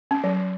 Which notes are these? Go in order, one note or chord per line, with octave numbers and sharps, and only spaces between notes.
C#4
F#3